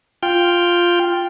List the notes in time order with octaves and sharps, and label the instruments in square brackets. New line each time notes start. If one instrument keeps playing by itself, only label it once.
[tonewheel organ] F4 G5